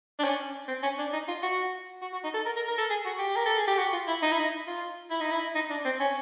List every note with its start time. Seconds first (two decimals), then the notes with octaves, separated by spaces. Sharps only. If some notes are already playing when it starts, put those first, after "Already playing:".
0.19 D4
0.24 C#4
0.68 C4
0.83 C#4
0.98 D4
1.13 D#4
1.28 F4
1.43 F#4
2.02 F#4
2.13 F#4
2.24 D#4
2.34 A4
2.46 A#4
2.56 A#4
2.68 A#4
2.78 A4
2.90 G#4
3.05 F#4
3.19 G4
3.36 A#4
3.46 A4
3.58 G#4
3.67 G4
3.78 F#4
3.93 F4
4.08 E4
4.22 D#4
4.32 E4
4.39 D#4
4.67 F4
5.10 E4
5.21 D#4
5.31 E4
5.55 D#4
5.70 D4
5.85 C4
6.00 C#4